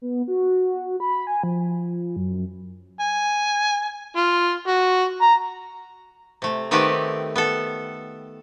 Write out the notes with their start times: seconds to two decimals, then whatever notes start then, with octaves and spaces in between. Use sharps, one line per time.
0.02 B3
0.28 F#4
1.00 B5
1.27 G#5
1.43 F3
2.16 F#2
3.00 G#5
4.17 F4
4.68 F#4
5.22 A#5
6.42 C3 A3
6.71 D#3 A3 B3 C4 G4 B4
7.36 B3 A4